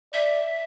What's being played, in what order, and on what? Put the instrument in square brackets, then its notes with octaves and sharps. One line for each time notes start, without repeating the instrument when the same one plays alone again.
[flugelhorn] D5 [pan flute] E5